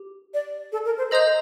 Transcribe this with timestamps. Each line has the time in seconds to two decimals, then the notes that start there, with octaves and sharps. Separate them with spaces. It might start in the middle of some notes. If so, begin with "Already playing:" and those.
Already playing: G4
0.34 D5
0.72 A4
0.85 A#4
0.98 C5
1.11 A4 C5 D#5 A#5 D#6 G6